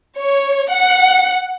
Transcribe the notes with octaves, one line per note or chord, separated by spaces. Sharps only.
C#5
F#5